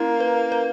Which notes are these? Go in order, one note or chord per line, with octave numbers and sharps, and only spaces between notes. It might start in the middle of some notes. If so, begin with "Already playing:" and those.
Already playing: A#3 C#4 E4
B4
B4